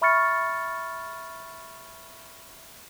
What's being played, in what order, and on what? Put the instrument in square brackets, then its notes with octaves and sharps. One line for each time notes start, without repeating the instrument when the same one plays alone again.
[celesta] E5 B5 C#6 F6 A6 C#7